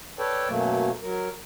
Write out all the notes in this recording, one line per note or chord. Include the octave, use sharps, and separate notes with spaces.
A4 B4 C#5 D5 G5 A5
F#2 B2 F#3 A3 A#3
F#3 A#4